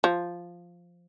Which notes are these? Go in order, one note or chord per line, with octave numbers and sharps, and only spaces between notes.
F3